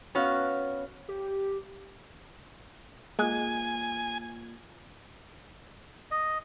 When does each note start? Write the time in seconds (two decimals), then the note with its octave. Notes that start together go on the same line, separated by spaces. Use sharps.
0.15 B3 C#4 F#4 F5
1.09 G4
3.19 G#3 A#3 F4 G#5
6.11 D#5